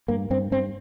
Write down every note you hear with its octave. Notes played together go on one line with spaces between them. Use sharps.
G2 A#3
G2 C4
G2 C4